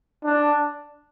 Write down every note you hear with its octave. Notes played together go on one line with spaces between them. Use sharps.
D4